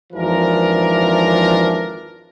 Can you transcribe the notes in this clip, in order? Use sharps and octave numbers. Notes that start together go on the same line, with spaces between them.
G#1 F2 E3 F3 D4 A#4